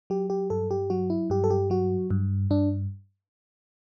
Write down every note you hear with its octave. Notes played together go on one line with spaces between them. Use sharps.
F#3 G4
G4
G2 A4
G4
F#3 F#4
E4
G2 G4
A4
G4
F#3 F#4
G2
G2 D4